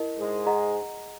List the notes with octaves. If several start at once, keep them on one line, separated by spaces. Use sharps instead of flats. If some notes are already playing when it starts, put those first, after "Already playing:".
Already playing: E4 A#4 D#5
G#2 G#3
G#4 D#5 F#5 A#5